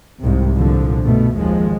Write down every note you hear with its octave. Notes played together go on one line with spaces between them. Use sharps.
C2 G#2 C3
C2 A#2 D3 F3
G2 B2 A3
G#1 D#2 F3 G#3